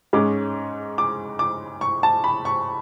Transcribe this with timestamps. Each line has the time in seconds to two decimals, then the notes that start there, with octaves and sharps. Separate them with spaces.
0.13 G#2 G#3 C#4 D6
0.98 D6
1.39 D6
1.81 C#6
2.03 A5
2.24 B5
2.45 C#6